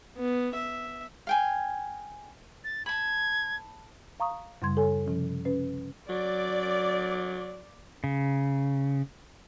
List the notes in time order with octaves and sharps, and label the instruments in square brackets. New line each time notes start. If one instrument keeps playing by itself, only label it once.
[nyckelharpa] B3
E5
[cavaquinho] F5 G5 G#5
[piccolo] A6
[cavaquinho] A5 B5 [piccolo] G#6
[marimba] F5 A#5 C#6 D#6
F#2 C#3 G3 C6 G#6
A4 C#5 G#5
C3 F3 C#4
C#4 B4
[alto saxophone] F#3 [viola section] D5
[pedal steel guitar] C#3